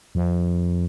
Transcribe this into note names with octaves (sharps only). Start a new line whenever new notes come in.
F2